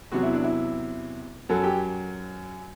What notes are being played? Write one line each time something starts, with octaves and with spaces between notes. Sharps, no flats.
E2 C3 F#3 F#4
E4
D4
E4
F#2 F#3 A4
G4